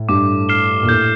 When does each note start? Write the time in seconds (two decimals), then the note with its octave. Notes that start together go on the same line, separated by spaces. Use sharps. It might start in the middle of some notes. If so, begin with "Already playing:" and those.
Already playing: A2
0.08 G2 D6
0.49 F6 C7 E7 G7
0.83 A#2
0.89 A2 G6